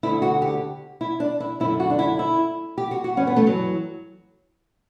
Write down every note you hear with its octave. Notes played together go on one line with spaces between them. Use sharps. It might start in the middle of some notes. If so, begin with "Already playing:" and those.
D2 D3 E4
F#4
G4
E4
D4
E4
F#2 D3 E4
F#4
D4
E4
E4
G4
F#4
F#4
G2 E3 C#4
B3
A3
F#3